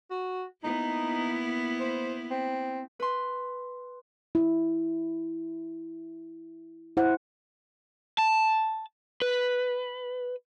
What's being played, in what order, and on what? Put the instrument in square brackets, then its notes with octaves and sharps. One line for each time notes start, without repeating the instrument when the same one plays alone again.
[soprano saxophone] F#4
[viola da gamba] A#3 B3 E4 [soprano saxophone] D#4
[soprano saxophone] C5
C4
[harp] B4 C6
[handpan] E4
E4 C5 F#5
[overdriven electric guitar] A5
B4